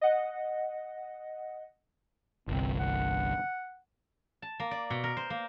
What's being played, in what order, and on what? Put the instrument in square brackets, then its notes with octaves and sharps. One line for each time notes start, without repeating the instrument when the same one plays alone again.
[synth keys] D#5 F#5
[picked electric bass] G1 C2 [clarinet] C4
[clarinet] F#5
[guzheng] A5
A#3
D5
B2
A#4
C5
A#3